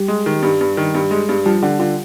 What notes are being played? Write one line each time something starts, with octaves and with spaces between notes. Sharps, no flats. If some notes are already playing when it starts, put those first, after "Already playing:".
Already playing: G3 G4
G#3
D#3
G2
G2
D#3
G2
G#3
G2
F3 G3 G4
D3 G3 G4
D3 F4